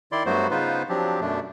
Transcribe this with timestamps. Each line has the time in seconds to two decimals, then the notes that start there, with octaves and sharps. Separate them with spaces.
0.12 D#3 E4 D5 C6
0.26 G2 F#3 A3 B3 F#4 C5
0.51 C#3 B3 D#4 F4 B4 C5
0.89 F3 F#3 C4 D4 G4
1.21 F#2 B2 A3 D4